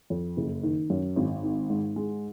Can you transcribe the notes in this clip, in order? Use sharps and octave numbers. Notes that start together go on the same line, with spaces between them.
F2
F#1
D#3
F#2
G#1
D#3
G#2
G#3